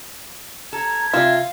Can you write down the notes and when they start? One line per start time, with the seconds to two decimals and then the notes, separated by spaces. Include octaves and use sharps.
0.73 A4 A#5 G#6
1.13 C3 F4 E5 F5